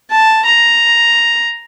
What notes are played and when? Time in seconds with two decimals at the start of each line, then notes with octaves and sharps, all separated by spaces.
0.11 A5
0.45 A#5